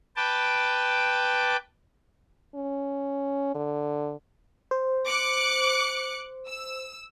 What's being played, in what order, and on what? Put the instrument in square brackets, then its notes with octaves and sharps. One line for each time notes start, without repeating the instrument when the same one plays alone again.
[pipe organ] B4 G5 A5 D6
[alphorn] C#4
D3
[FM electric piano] C5
[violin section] D6 F#6 C#7
E6